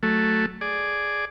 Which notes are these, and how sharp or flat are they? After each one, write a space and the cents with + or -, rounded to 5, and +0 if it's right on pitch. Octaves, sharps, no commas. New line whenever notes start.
F#3 +0 A3 +0
G#4 +0 D5 +0